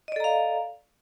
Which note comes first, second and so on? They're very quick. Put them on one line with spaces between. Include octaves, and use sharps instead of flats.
D#5 D5 A4 A#5 F5